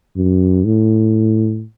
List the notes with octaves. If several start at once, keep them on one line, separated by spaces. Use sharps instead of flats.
F#2
A2